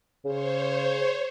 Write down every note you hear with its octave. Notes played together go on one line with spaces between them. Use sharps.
C#3 C5 C#5